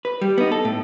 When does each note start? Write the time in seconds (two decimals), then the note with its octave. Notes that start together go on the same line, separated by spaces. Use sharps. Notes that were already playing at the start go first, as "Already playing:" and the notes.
0.05 B4
0.22 G3
0.38 B3 D#4
0.52 A4
0.65 A2